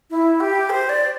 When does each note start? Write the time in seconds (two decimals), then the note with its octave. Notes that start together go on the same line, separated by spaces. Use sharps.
0.11 E4
0.40 G4
0.70 C5
0.89 D5